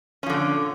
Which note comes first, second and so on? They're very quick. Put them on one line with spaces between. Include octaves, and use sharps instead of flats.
C#4 F3 D3 A#2